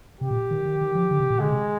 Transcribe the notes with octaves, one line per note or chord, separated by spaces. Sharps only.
C3 G4
A#2
D#3
D#3
D#3
F3
D3
C3
A#2
D3 G#3
C3